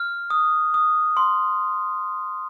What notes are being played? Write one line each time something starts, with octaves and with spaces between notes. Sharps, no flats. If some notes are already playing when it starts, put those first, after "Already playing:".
Already playing: F6
D#6
D#6
C6